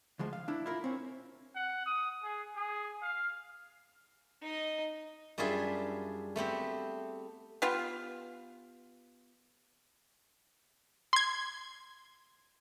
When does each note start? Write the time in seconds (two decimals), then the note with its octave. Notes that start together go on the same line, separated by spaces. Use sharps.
0.19 D2 F3 G#3
0.33 F5
0.48 D4 E4
0.66 E4 F4 A#4
0.84 C4 C#4
1.55 F#5
1.86 D#6
2.24 G#4
2.56 G#4
3.02 F5
4.42 D#4 D#5
5.38 F#2 G3 D4 F4 G#4 E5
6.36 A3 B3 C4 G4
7.62 B3 F4 G4
11.13 C6 G#6